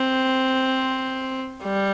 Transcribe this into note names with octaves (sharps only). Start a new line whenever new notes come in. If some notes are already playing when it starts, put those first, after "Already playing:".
Already playing: C4
G3